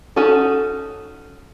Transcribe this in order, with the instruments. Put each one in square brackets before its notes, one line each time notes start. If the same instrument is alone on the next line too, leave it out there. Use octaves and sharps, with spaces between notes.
[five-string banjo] C#4 D#4 F#4 A4